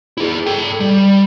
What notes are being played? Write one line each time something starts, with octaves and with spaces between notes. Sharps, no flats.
E4 G#4
A4 G5
G3